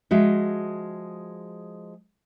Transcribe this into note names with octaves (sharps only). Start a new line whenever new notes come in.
F3 G#3 F#4 E5